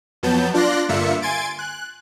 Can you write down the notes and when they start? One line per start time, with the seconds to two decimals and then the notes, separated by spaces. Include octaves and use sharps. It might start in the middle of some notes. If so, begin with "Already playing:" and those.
0.23 F2 F#3 B3 A5 G6
0.54 D4 F4 D5 C6 F#6 A#6
0.89 G2 D3 A#3 F4 E5 C#7
1.22 G#5 C6 G#6 A6 D7
1.59 F#6